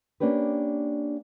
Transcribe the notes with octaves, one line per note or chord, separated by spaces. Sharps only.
A#3 C#4 D4 G4 B4